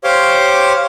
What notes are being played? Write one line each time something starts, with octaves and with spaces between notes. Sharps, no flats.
G4 C5 C#5 F5 C6 D6